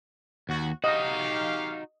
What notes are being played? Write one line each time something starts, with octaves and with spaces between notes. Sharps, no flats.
D#2 F#4
D#4 F#4 G4 D#5 F5